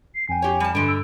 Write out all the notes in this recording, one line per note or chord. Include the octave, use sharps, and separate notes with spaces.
C7
F2 G5 G#5
G4 C#5
G3 A5
G2 D3 G#3 D7
E6